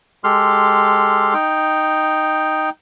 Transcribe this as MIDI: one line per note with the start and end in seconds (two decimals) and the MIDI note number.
0.24 1.34 56
0.24 1.34 67
0.24 1.34 69
0.24 1.34 84
0.24 1.34 89
1.34 2.70 63
1.34 2.70 79